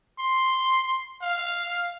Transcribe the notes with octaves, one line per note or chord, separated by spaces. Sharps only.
C6
F5